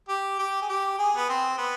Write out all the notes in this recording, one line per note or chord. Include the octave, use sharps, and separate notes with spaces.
G4
G4
G#4
G4
G#4
B3
C4
B3